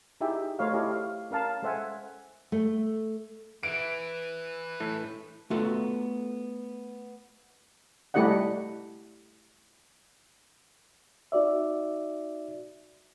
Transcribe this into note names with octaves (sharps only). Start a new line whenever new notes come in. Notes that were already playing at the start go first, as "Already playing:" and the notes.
D#4 E4 G4 G#4 E5 G5
A3 F#4 C5 C#5 D#5 F5
E4 G4 A4 C#5 D#5
F5
C#4 A#4 F5 A5
G#3 A4 C5 E5 F#5 G#5
A3
B4 E5 D7
A2 E3 A3
A3 B3 F4 F#4 A4
G3 A3 E4 G4 D#5 F#5
D#4 F#4 D5 E5